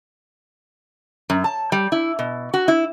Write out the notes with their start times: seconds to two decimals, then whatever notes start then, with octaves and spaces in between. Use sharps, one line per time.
1.30 F#2
1.44 A5
1.72 G3
1.92 E4
2.19 B2
2.54 F#4
2.68 E4